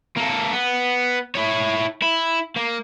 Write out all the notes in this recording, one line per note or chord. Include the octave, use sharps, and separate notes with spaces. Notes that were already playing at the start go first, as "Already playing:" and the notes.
A#3 A4
B3
E4 C#5
E4
A#3